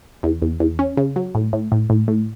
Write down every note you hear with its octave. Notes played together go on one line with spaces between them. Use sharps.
E2
E2
E2
C#4
C#3
F#3
A2
A2
A2
A2
A2